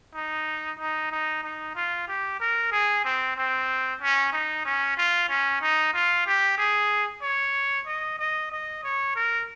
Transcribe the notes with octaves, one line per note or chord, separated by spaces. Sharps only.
D#4
D#4
D#4
D#4
F4
G4
A#4
G#4
C4
C4
C#4
D#4
C#4
F4
C#4
D#4
F4
G4
G#4
C#5
D#5
D#5
D#5
C#5
A#4